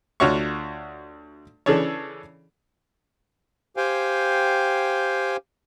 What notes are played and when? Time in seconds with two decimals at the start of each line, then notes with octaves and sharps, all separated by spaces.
0.20 D2 F4 F#4 C#5 F5 C#6
1.66 C#3 E3 D4 G#4 A4 C#5
3.77 G4 C5 F5 G5 G#5